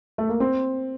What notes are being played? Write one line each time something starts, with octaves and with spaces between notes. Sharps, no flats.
A3
A#3
C4